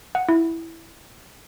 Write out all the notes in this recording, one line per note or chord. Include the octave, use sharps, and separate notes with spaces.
F#5
E4